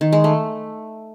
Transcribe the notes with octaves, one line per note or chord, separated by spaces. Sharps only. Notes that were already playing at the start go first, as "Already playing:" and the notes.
D#3
G#3
A3